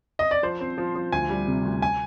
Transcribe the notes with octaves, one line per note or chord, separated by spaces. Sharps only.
D#5
D5
F3 C5
C4
F3
F3
D2 G#5
G3
C3
D2
G#5